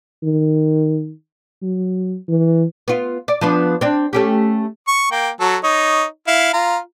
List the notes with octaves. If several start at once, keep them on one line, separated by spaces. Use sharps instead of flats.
D#3
F#3
E3
B3 F4
D5
F3 B3 D4
C4 D4
A3 C#4 G4
C#6
A#3 G5
F#3 A4
D#4 C#5
E4 F5
F4 A#5